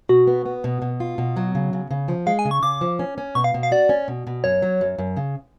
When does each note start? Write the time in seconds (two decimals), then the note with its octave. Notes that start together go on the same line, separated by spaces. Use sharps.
0.09 B2 F#4
0.27 B3
0.46 B3
0.64 B2
0.82 B2
1.00 F4
1.18 B2
1.36 F#3
1.55 C#3
1.73 C#3
1.91 C#3
2.08 F3
2.27 G#3 F5
2.39 G#5
2.45 C#3
2.51 C#6
2.62 C#3 D6
2.81 F3
2.99 C#4
3.18 C#4
3.35 B2 C#6
3.44 F5
3.54 B2
3.63 F5
3.72 F#4 D5
3.89 C#4
4.08 B2
4.27 B2
4.44 F#2 C#5
4.62 F#3
4.81 F#2
4.98 F#2
5.17 C#3